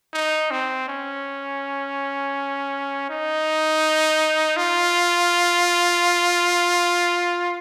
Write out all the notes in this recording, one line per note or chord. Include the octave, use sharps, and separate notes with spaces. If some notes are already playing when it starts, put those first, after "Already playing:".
D#4
C4
C#4
D#4
F4